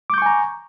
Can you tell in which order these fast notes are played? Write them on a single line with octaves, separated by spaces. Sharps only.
D6 G6 C#6 G#5 A#5